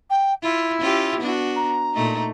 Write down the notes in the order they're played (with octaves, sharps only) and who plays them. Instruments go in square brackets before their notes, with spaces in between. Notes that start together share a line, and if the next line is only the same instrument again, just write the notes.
[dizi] G5
[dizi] E4 [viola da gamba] F4
[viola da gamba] C#4 F4 G4
B3 D4 F#4
[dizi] A#5
[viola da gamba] A#2 A3 D#4